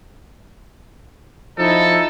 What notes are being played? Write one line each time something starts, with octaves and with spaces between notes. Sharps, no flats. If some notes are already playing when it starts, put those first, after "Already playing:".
F3 D#4 E4 A4